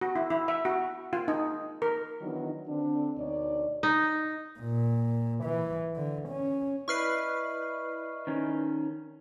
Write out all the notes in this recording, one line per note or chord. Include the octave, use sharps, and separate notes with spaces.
F#4
E4
E4
E5
F#4
F4
D#4
A#4
D#3 E3 F#3 B3 D4 D#4
D3 C4 D4
D2 B2 D#4 C#5 D5
D#4
A#2
E3
D3
C#4
E4 B4 D5 D#5 C#6 F6 C7
D#3 C#4